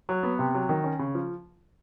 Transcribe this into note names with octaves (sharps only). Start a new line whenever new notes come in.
F#3
B3
C3
F#3
D#3
C#4
C#3
F3